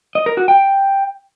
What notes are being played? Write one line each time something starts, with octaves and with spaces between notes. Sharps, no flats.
D#5
A#4
F#4
G5